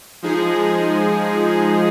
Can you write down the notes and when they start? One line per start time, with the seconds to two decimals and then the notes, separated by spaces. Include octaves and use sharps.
0.22 F3 G#3 D#4 G#4